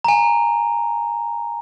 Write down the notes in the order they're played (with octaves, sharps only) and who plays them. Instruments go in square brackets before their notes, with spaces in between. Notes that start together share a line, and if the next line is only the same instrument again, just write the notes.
[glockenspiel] G#5 A#5